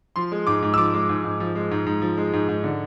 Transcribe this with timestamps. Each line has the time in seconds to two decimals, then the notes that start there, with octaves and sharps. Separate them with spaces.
0.16 F3 C6
0.32 G#3
0.47 G#2 D6
0.62 G#2
0.74 E6
0.78 F3 D6
0.94 G#3
1.09 G#2
1.24 G#2
1.40 F3
1.55 G#3
1.71 G#2
1.86 G#2
2.02 F3
2.17 G#3
2.33 G#2
2.49 G#2
2.64 D3